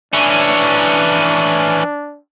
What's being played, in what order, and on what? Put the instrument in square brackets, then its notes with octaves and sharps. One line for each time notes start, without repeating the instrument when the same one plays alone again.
[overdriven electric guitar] E3 C#4 [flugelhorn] D4